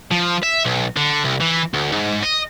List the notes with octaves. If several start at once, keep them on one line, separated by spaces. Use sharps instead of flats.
F3
E5
B1
D3
C2
E3
D2
G#2
D#5